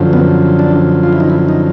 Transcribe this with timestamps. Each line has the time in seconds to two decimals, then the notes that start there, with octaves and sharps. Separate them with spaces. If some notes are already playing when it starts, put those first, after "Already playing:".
Already playing: F#2 D3 F3
0.13 B3
0.59 D4
1.03 F4
1.13 E4
1.20 D#4
1.30 E4
1.49 D#4